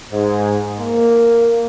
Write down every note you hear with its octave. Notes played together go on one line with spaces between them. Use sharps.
G#2
A#3